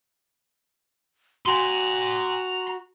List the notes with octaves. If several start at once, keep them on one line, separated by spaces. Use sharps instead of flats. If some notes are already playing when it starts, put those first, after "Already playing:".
F#4 A#5 C6